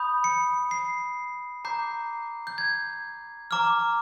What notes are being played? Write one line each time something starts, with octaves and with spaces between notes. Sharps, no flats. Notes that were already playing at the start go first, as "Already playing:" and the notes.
Already playing: B5 D#6 G6
C#7
C7
A#5 D6 G6 C7
G6
G#6
A#5 D6 F6